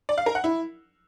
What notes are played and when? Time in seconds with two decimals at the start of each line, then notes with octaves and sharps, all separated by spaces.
0.09 D5
0.18 F5
0.26 A#4
0.35 F#5
0.44 E4